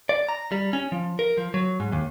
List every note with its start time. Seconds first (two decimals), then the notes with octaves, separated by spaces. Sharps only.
0.09 D5
0.29 A#5
0.52 G3
0.73 C#4
0.92 F3
1.19 A#4
1.38 F3
1.54 F#3
1.80 G#2
1.92 D#2